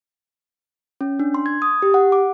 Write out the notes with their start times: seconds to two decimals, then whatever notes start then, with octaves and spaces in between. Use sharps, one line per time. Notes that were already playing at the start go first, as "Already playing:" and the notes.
1.01 C#4
1.19 D4
1.34 C6
1.46 G#6
1.62 D#6
1.82 G4
1.94 F#5
2.12 D6